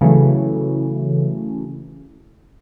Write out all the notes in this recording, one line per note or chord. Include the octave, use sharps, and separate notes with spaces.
C#3 E3 F#3 A3